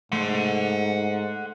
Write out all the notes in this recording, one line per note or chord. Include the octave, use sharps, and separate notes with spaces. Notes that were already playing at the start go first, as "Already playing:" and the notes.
G#2 A3 F#5 C6